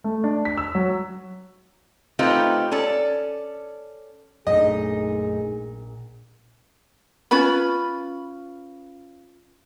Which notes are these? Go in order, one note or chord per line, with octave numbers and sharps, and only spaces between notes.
A3
D4
B6
E6
F#3
A3 C4 D#4 F4 G4 B4
C#4 A4 D5
A#1 F#2 A3 D#4 G#4 D#5
C#4 F4 B4 B5